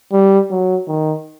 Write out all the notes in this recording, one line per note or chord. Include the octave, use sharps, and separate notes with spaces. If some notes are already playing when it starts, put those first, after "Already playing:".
G3
F#3
D#3